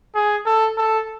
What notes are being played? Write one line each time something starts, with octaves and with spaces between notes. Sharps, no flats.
G#4
A4
A4